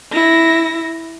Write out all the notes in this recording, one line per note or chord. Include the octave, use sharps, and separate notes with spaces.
E4 A#6